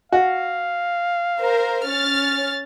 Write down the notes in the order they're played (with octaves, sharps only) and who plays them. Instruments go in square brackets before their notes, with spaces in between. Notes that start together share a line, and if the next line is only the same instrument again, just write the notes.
[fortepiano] F#4 [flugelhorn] F5
[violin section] A#4 C5
C#4 F6 A6